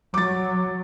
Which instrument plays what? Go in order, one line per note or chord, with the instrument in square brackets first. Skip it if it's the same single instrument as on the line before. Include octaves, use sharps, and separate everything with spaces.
[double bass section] F#3 [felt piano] D6 A6